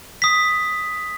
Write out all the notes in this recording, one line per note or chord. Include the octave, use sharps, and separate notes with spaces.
D#6 B6